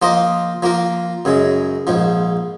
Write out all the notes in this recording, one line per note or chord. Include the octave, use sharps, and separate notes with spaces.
F3 A#3 F4 C5 D#5
F3 A#3 F4 A#4
F#2 C#3 G#3
A#1 G#2 F3